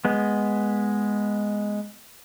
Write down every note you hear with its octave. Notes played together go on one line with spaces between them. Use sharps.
G#3 B3